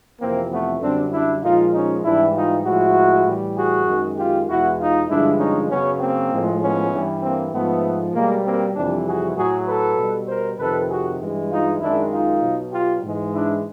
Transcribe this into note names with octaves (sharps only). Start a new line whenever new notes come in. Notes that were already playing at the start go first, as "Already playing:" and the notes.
F2 C3 E3 A#3 C4
A3 B3
F#2 D3 G3 C4 D4
D4 E4
A#2 F3 G#3 D#4 F4
C#4 D#4
G#2 E3 G3 D4 E4
D#4 F4
A2 F3 G#3 E4 F#4
A2 E3 G3
F#4 G#4
F#2 D#3 G#3
F4 G4
E2 B2 G#3 E4 F#4
D#4 F4
G2 D3 F3 G#3 D4 E4
C#4 D#4
F#2 C#3 F#3 B3 C#4
A#3 C4
A2 F3 G#3
B3 C#4
G2 E3 G3
A#3 C4
G#2 F3 G#3 A3 B3
B2 G3 G#3 A#3
A#3 C4
F2 C3 E3 G3 C4 D4
F#4 G#4
A2 F#3 F#4 G#4
A4 B4
B2 G3
A#4 C5
F2 C3 D#3 A4 B4
F#4 G#4
G2 E3 G#3
D#4 F4
F#2 D#3 G#3 D4 E4
D#4 F4
B2 F#3
F4 G4
G#2 E3 G#3
D4 E4